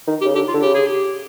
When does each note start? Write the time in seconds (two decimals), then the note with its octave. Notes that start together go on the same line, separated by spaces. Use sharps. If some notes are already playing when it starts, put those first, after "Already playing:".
0.07 D#3
0.21 G4
0.25 C#3
0.34 D3 G4
0.48 F4
0.54 D3
0.62 C#3 G4
0.74 G#4
0.87 G4